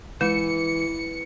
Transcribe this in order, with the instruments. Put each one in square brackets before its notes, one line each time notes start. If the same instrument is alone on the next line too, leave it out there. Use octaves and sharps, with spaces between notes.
[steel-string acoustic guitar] E3 [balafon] G#3 [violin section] C#7